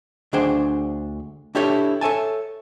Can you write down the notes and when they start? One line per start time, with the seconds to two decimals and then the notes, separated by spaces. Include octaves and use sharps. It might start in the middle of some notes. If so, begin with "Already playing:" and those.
0.33 D2 D4 G#4 C5 G5
1.55 D4 E4 G4 A4 C#5
2.01 A4 C#5 E5 G#5 A5